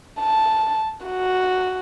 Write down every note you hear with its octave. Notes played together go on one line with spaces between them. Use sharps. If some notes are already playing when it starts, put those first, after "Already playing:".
A5
F#4